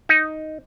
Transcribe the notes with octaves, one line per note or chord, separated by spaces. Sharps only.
D#4